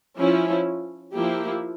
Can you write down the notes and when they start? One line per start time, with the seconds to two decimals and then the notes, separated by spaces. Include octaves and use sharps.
0.18 F3 C#4 E4
1.14 F3 A#3 E4 G4